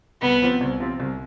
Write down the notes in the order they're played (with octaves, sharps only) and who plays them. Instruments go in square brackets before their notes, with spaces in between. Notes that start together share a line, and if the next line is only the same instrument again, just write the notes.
[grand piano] C2 [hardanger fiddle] B3
[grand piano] C3 F3 C4 F4
C2
C3 F3 C4 F4
C2